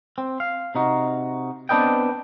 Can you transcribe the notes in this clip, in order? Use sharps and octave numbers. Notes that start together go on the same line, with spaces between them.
C4
F5
C3 D#4 F#4
B3 C4 D4 B4 D#5 G5